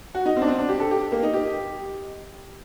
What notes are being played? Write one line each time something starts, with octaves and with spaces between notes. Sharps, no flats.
F#4
D#4
C4
D4
C4
D4
G4
A4
G4
A#3
D#4
G4